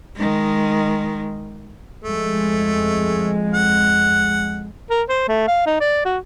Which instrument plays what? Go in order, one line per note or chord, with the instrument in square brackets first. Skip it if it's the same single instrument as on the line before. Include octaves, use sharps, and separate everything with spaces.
[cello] D#3 G#3
[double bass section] F2 G#3 [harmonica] A3
[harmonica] F#5
[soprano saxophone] A#4
C5
A3
F5
D#4
D5
F#4